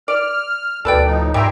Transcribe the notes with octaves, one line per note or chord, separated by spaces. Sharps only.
D5 F6
D2 B2 A4 B4 D5 G5
A2 F3 D#4
G#2 G3 E5 G5 G#5 A#5 C6